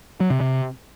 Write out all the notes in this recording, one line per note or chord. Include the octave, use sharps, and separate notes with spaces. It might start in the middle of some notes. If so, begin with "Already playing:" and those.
F#3
C3
C3